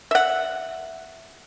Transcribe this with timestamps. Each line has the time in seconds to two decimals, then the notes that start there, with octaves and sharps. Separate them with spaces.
0.11 E5 F#5